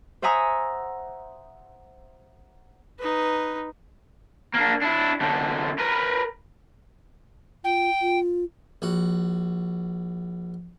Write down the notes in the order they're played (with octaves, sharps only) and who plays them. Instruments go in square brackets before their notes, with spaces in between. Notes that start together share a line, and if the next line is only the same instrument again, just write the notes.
[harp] C5 E5 F#5 G#5 A#5 D#6
[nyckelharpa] D#4 B4
[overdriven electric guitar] A#3 D4
D4 E4
F#2 D3
A#4 B4
[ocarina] F4 [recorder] G5
[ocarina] F4
[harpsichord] A#1 F#4